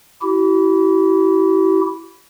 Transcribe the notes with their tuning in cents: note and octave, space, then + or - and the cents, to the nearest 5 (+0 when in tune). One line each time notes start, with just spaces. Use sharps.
E4 +0 G4 -45